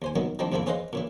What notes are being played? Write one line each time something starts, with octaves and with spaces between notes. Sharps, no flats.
D#2 C5 G#5
F#2 D#3 F#3 B3 D#4
D#3 F3 G3 A#3 C4 D4
E2 G#2 D3 F3 A#3 E4
C#4 G#4 B4 C5 D#5 F5
A#2 C#3 E3